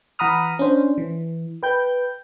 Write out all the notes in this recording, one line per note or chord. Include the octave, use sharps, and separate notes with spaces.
E3 F#5 A#5 B5 D#6 F6
C#4 D4 C5
E3
B4 G5 G6